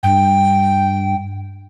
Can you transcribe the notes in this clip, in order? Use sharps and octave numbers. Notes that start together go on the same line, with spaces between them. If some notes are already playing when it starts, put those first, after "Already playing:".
G2 G5